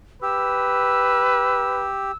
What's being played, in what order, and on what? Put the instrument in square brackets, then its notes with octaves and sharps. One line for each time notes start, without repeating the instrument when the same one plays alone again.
[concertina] G4 [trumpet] B4 [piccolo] E6